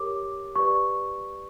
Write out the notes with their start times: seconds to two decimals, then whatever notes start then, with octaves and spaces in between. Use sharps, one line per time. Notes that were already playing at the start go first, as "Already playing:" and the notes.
Already playing: G4 A#4 C#5 D6
0.56 G4 B4 D5 C#6